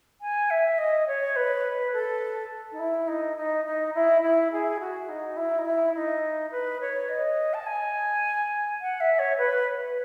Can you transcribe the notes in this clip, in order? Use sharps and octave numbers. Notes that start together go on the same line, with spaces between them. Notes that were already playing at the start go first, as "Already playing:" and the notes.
G#5
E5
D#5
C#5
B4
A4
D#4
E4
D#4
D#4
D#4
E4
E4
G#4
F#4
D#4
E4
D#4
E4
D#4
B4
C#5
D#5
A5
G#5
F#5
E5
C#5
B4